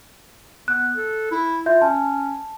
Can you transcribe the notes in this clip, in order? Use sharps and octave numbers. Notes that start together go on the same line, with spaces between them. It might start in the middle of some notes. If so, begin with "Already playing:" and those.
B3 F#6
A4
E4
F4 E5 G6
C#4 A5